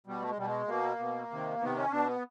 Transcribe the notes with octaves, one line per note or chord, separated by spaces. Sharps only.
B2 G3
A3
G#3
B2 G3
G#3
B2 A#3
B2
C3 D#3
C3 D#3 B3
C#4
B2 D4
B3